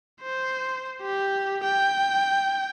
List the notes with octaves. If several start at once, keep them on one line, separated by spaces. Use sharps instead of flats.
C5
G4
G5